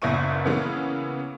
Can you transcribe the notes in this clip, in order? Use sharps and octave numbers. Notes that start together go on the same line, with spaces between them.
F#1 A#2 B3 E4 C#6 D#7
C#3 E3 A#3 B3 C#4